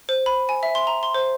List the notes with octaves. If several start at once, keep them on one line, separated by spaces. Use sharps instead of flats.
C5
B5
G#5
E5
C6
A#5
C6
C5